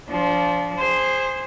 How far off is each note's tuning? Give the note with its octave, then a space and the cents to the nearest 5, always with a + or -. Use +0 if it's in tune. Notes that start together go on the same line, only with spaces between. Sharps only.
F3 +0 D4 -30
G#4 -20 C5 +0